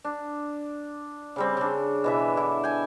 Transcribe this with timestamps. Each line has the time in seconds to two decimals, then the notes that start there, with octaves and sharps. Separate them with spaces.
0.04 D4
1.36 C#3 G3 C4
1.57 C#3 D4
2.04 B2 E3 E5
2.37 D3 E4
2.64 G5 G#5